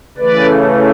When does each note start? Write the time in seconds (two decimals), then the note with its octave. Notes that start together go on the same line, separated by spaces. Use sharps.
0.18 C#3 E3 A3 B4 D5